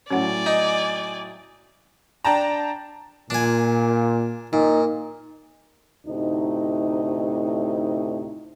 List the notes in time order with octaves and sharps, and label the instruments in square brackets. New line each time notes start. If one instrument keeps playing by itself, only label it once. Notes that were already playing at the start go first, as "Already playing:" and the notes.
[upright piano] A2 F#3 [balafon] C#4 C#5 F#5 [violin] D5 G#5
[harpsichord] D#4
[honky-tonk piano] D4 G5 A5 A#5
[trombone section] A#2 [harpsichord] D4 G#5
[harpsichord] A#2 [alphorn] D#4
[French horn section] D2 A2 C3 D#4